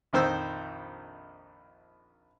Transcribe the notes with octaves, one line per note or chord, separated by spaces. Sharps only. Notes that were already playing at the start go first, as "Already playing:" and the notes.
A#1 F2 D#3 C5 C6 E6